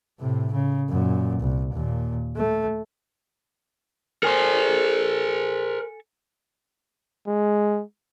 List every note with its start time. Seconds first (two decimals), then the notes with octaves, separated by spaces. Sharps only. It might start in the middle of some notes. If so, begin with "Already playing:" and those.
0.20 A2 C3
0.53 C#3
0.89 F#2 A#2
1.40 C2
1.73 D#2 A#2
2.37 A3
4.23 A4 A#4 C5 G#5
7.27 G#3